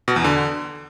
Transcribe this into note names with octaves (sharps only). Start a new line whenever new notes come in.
B2
E2
D3